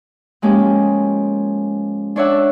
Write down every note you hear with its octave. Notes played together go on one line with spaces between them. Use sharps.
F3 G#3 A#3 C#4 G4
D4 A4 C#5 D5 E5 F#5